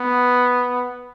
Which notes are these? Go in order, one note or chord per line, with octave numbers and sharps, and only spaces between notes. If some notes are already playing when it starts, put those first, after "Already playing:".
Already playing: B3